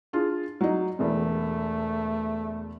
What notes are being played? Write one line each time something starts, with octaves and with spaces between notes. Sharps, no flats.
D4 F4 G#4
F#3 D#4
E1 E2 A3